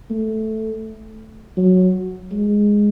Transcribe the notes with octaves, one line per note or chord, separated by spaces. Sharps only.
A3
F#3
G#3